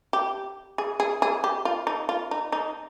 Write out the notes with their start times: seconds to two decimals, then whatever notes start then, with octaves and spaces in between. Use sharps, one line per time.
0.13 G4
0.78 G#4
1.00 G#4
1.22 G#4
1.44 G4
1.65 F4
1.87 D#4
2.09 F4
2.31 D#4
2.52 D#4